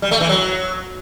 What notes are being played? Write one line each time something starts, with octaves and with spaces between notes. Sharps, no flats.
G3
A3
E3
F#3